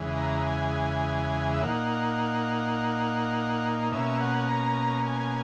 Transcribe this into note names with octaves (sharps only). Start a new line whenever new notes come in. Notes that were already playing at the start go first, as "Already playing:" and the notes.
Already playing: E2 C#3 E3 G#3
A#5
G#5
E5
A#2 A#3 D#4 F#5
B2 A#3 C#4 E5
F#5
A#5
G#5